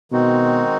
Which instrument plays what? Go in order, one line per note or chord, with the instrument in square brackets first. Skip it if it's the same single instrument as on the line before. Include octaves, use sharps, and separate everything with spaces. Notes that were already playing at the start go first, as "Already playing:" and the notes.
[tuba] B2 [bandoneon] D#3 G#3 C4 D#4 F#4